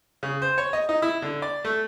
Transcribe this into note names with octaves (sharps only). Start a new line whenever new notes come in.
C#3
C5
C#5
D#5
D#4
E4
D3
D5
A3